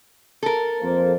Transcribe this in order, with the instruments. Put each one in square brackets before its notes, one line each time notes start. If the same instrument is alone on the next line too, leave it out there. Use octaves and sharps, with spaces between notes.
[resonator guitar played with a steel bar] A4 A#4
[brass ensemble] F2 A#3 C5